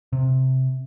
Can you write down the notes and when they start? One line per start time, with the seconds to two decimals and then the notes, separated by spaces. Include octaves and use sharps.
0.13 C3